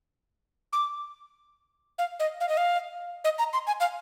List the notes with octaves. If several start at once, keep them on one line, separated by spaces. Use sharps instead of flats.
D6
F5
D#5
F5
D#5
F5
D#5
A#5
C6
G#5
F5